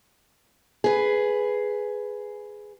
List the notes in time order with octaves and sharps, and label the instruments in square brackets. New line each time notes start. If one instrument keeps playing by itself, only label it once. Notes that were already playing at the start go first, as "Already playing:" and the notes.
[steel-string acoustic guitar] G#4 B4